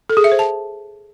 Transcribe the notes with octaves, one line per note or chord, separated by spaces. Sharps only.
A4
G#4
E5
C5
A5